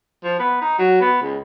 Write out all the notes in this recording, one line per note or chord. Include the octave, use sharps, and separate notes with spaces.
F3
B3
D#4
F#3
B3
C#2